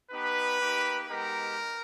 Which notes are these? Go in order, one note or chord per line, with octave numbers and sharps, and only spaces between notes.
B3 D#4 G4 B4
A#3 D#4 G4
G#3 B3 D#4 G4 A#4